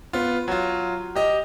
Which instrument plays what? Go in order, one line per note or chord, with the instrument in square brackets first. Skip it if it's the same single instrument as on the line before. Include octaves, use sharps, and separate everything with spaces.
[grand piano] B3 F4
F#3 F4
G4 D#5